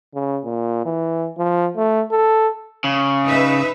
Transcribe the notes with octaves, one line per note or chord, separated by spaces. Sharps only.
C#3
A#2
E3
F3
A3
A4
C#3
D#4 B4 E5